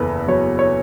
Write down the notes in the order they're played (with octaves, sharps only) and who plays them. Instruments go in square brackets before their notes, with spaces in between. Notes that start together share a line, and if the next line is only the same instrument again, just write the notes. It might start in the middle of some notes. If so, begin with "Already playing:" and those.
Already playing: [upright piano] F#1 E2 A4 B4
F#3 C#5
C#5